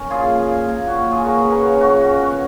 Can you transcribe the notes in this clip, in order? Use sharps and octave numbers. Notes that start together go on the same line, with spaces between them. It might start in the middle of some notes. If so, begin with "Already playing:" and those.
Already playing: C#4 A#4
A#2 F4 G#4
F3
A#2
A#3
A#2 F#4
F#4
F#3
F4 G#4
A#2 F#4 A#4
G#4 B4
C#4
A#4 C#5
C#3 F#4 A#4
F3 F#4
C#3 F#4
B3